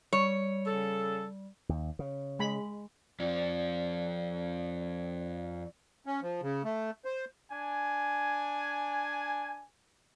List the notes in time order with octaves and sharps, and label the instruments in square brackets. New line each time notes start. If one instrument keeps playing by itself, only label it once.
[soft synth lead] G3 [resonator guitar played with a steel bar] C#5
[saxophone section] C#3 A4
[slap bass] D#2
C#3
[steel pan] G#3 B5
[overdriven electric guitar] F2 F3 [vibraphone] D5
[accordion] C#4
F3
C#3
A3
C5
[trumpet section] D4 G#5